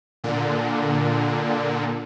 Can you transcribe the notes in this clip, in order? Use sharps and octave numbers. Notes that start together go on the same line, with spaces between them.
A#2 D3